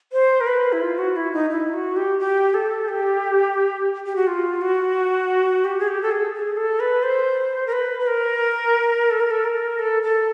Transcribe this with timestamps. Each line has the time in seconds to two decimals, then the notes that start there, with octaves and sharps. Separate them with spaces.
0.13 C5
0.41 A#4
0.47 B4
0.73 E4
0.81 F4
0.99 F#4
1.16 E4
1.33 D#4
1.50 E4
1.74 F#4
1.96 G4
2.19 G4
2.54 A4
2.89 G4
4.06 G4
4.16 F#4
4.27 F4
4.61 F#4
5.65 G4
5.79 G#4
5.88 G4
6.02 A4
6.11 G#4
6.34 G#4
6.57 A4
6.80 B4
7.03 C5
7.67 A#4
7.72 B4
8.00 B4
8.07 A#4
9.11 A4
9.20 A#4
9.31 A4
9.45 A#4
9.79 A4
10.03 A4